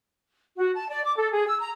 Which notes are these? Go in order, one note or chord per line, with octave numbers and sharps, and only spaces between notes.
F#4
A5
D5
D6
A4
G#4
E6
A#5